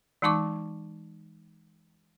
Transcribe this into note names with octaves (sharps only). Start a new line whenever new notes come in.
E3 G#3 D#4 A5 C#6 D6